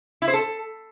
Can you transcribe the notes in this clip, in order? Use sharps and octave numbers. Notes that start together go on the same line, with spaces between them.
E4
C5
A4